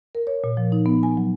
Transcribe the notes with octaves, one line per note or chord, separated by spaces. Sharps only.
A#4
C#5
A#2
F3
D#4
B3
G#5
F#3